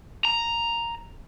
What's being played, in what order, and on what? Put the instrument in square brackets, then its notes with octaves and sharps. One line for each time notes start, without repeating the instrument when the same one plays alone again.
[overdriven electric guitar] A#5